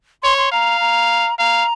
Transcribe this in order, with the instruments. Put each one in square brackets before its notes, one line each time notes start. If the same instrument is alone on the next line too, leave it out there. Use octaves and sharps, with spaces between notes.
[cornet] C#5 [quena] C6
[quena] C6
[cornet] F5 [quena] A#5
[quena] A#5
[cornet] F5 [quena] A#5